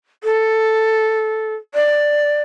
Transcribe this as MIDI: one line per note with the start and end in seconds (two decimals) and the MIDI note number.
0.24 1.54 69
1.75 2.42 74